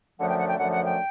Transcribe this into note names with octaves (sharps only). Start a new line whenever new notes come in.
F#2 D3 F3 A3 F#5
G5
F#5
G5
F#2 D3 F3 A3 F#5
F#5
G5